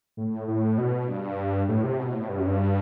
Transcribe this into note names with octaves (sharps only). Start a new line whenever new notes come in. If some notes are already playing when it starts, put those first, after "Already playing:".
A2
A2
B2
G2
A2
C3
B2
A2
G2
F#2
G2